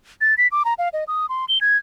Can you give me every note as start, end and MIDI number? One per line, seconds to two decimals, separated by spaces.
0.21 0.35 93
0.38 0.48 95
0.52 0.63 86
0.65 0.74 82
0.79 0.89 77
0.93 1.04 75
1.08 1.26 87
1.29 1.45 84
1.49 1.58 103
1.61 1.77 92